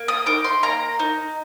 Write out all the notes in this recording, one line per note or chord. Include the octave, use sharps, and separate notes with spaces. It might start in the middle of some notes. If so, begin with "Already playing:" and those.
Already playing: A#3
D#6
D#4 D6
C6
A#3 A#5
D#4